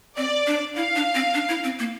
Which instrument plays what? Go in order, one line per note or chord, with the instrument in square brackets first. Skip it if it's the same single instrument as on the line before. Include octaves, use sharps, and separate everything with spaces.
[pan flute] C4 [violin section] D5
[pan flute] D4
[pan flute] E4 [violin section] F5
[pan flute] D4
C4
D4
E4
C4
A#3